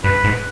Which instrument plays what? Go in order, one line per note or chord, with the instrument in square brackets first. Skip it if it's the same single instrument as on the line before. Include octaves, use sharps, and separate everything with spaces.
[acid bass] G2 [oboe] B4
[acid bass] G#2